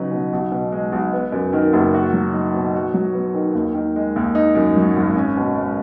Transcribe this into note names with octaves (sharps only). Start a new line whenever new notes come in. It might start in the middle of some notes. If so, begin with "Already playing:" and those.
Already playing: C#3 F#3 D#4 B4
B2
B1
B2
G#3
B1
B3
F#2
D#3
F#1
F#4
F#3
D#4
B2
F#4
F#3
B3
D#3
D#2
D#3
G#3
D#2
D#4
F#2
F#3
G#1
C#4
B2
G#3